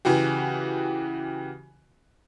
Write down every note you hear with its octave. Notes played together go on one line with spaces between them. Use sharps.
C#3 E3 F#4 G4